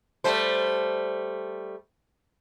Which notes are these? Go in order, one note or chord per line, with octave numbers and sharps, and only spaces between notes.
G3 A3 C5